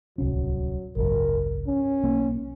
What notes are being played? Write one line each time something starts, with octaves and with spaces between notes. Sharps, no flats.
D1 C2 F#3 C#4
G#1 C#2 F#2 A#4
C#4
B1 A#3 B3